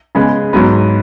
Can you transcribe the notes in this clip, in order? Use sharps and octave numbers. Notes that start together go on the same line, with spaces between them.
C#3 G#3 B3
G#2 F#3 B3